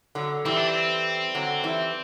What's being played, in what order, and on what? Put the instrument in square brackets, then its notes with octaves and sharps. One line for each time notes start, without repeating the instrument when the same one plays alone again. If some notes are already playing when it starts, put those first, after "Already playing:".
[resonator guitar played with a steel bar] D3 F#3
[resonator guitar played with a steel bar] E3 G3 [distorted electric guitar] C4
[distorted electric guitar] D4
C4
[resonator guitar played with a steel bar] D3 F#3
E3 G3